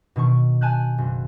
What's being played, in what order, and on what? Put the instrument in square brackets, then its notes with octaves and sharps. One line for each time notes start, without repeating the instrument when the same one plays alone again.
[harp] B2 D#3 D4 C#6
G#5 A5 F#6 G6
F#1